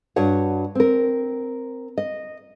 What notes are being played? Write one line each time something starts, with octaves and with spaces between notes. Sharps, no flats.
G2 F#4 C#5 F#5
C4 A#4
D#5